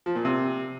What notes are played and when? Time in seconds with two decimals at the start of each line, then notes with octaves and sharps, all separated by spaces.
0.06 F3
0.15 A#2
0.25 C3